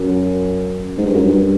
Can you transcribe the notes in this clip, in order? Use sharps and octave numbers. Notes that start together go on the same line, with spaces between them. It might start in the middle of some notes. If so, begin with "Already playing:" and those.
Already playing: F#2
G#2
G2
F#2
G2